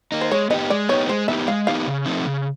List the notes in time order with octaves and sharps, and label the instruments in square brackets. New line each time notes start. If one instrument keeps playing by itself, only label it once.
[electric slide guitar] A#3 D#4
[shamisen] C5
[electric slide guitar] G#3 [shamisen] C#5
[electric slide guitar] B3 D#4 G4 [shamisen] D#5
[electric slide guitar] G#3 [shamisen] D5
[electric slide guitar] B3 D#4 G4 [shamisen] C#5
[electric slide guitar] G#3 [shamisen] C5
[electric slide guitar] B3 D#4 G4 [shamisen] E5
[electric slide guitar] G#3 [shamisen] F5
[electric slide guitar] B3 D#4 G4 [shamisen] F5
[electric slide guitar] C#3
F3 A3 C4 D#4
C#3